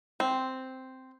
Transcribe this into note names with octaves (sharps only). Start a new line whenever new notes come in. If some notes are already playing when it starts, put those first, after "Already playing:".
C4